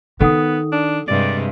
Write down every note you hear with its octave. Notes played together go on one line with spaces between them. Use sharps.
D#3 B3 A4 F#5 D#6
D4
G2 C3 G#3 D5